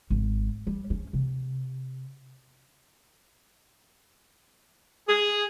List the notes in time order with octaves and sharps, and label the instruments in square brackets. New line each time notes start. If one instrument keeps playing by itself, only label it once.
[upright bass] G#1
G3
C#4
C3
[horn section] G#4